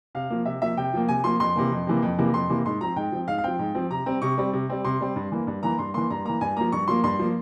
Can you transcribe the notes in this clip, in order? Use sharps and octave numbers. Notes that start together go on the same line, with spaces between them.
C3 F5
F3 A#3
C3 E5
F3 A#3 E5
C3 G5
F3 A#3
C3 G#5
F3 A#3 C6
F2 C6
C3 E3 A#3
F2
C3 E3 A#3
F2
C3 E3 A#3
F2 C6
C3 E3 A#3
G#2 C6
F3 C4 A#5
G#2 G5
F3 C4
G#2 F5
F5
F3 C4 G5
G#2
F3 C4
C3 A#5
G3 C4
C3 C#6
G3 C4
C3
G3 C4
C3 C6
G3 C4
G2
E3 A#3
G2
E3 A#3 A#5
G2 C6
E3 A#3 C6
G2 A#5
E3 A#3 A#5
G2 G#5
F3 A#3 A#5
G2 C#6
F3 A#3 C6
G2 C6
F3 A#3